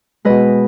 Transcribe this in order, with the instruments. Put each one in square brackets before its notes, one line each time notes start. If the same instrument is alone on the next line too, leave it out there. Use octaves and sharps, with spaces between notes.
[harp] B2 G#3 B4 D#5